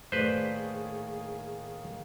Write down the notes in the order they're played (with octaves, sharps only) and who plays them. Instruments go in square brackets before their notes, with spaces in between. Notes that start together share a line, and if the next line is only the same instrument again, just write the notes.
[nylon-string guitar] A2 D5 [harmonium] D#3 A#3 [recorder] G#4 [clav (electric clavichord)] B4 C5